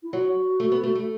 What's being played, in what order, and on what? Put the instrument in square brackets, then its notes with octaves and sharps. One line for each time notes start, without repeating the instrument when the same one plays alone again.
[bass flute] E4
[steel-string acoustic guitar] F#3 [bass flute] F#4
[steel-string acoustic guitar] A3
B3
A3
A3